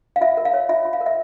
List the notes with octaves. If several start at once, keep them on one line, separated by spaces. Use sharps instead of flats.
F5
F4 E5
A#4
F5
C#5
F4 E5
F4
F5
A#4
E5